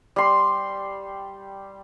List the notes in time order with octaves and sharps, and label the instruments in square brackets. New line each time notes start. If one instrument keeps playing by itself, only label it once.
[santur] G3 C6